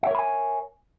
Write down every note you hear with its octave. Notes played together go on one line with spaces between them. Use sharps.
A#4 C#5 E5 G#5 B5